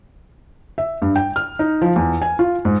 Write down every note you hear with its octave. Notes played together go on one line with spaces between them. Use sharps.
E5
G2
G5
F6
D#4
F3
E2
G#5
F4
G#2